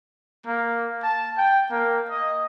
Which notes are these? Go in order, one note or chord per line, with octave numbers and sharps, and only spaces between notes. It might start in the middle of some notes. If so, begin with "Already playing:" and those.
A#3
A5
G5
A#3
D#5